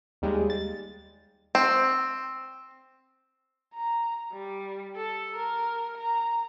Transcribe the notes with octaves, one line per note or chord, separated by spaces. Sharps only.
D#2 G3 G#3
A6
C4
A#5
G3
A4
A#4
A#5